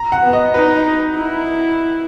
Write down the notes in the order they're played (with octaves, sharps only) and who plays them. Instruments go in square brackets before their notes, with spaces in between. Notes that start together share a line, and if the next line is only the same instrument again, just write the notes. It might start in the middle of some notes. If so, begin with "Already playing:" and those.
Already playing: [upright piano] A#5
F#5
[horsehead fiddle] B3
[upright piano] D#5
[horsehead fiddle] D#4 [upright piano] B4
[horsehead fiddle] E4